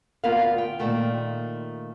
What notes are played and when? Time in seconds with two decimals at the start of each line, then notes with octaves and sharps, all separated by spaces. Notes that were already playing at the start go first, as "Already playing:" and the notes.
0.24 D2 B3 F4 A#4 B4 F5
0.58 G5
0.79 A#2 D#3 A3 F4